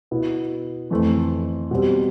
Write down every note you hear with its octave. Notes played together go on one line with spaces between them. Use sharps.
B2 B3 E4
F2 E3 A3 C4
B2 G3 C4